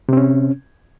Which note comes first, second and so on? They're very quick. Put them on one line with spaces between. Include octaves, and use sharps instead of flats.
C3 C4 C#4